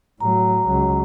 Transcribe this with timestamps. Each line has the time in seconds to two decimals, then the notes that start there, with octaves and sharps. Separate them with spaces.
0.20 A2 F#3 A#5
0.67 C#2 F#3